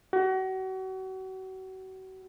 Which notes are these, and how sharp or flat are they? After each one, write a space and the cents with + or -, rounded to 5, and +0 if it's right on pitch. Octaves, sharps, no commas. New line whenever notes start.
F#4 +35